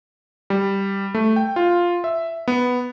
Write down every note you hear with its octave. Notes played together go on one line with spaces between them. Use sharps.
G3
A3
G5
F4
E5
B3